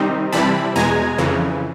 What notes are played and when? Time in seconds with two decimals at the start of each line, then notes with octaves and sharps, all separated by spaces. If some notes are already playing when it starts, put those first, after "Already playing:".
Already playing: C3 D#3 G3 C4 D#4
0.33 C3 E3 G3 C4 E4 A5 B5
0.76 E2 B2 G#3 G#5 A#5
1.18 F2 C#3 E3